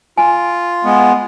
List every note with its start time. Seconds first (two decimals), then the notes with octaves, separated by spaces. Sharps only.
0.17 F4 G#5
0.85 G#3 B3